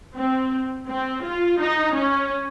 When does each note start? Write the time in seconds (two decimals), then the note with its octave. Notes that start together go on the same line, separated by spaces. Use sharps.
0.15 C4
0.87 C4
1.23 F4
1.59 D#4
1.95 C#4